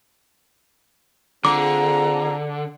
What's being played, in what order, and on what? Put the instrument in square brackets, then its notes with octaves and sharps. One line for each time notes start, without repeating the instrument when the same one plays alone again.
[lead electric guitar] D3 [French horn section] C4 F4 G#4 [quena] A#5 [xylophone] D6